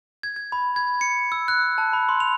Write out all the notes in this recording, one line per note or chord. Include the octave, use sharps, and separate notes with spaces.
G#6
G#6
B5
G#6
C#7
E6
F#6
A5
B5
C6
F7